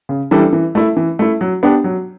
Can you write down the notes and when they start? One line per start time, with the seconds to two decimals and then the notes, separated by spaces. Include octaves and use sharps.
0.09 C#3
0.31 E3 G3 D4 A4
0.53 E3
0.75 A3 E4
0.97 E3
1.19 A3 E4
1.41 F#3
1.63 B3 D4 G4
1.84 F#3